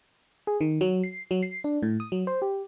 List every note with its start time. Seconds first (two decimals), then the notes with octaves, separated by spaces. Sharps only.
0.47 G#4
0.61 D#3
0.81 F#3
1.04 C7
1.31 F#3
1.43 C7
1.64 D4
1.83 A2
2.00 D#6
2.12 F#3
2.27 C5
2.42 G4